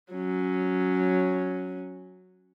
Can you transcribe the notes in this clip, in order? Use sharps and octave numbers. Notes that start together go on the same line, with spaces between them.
F#3 C#4